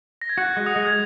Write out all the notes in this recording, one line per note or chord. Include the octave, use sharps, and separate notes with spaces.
A#6
G#6
F#4 F#6
G#3
D#6
G#3
G#6